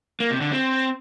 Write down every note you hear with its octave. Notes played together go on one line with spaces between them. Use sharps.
A#3
C3
D3
C4